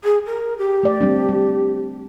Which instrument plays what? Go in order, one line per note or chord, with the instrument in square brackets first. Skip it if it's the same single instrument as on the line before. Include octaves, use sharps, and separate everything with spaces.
[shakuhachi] G#4
A#4
G4
[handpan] A3 D5
G3 C4 D4
G3